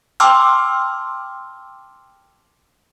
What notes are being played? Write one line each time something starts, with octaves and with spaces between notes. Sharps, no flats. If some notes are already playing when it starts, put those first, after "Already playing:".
G5 A5 C6 D6 E6 F6